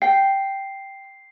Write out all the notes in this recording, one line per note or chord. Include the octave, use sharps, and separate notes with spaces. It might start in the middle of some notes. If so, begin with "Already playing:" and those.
G5 C7